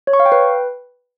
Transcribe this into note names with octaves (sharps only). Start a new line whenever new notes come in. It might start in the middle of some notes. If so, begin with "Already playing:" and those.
C#5
C#6
F5
G5
B4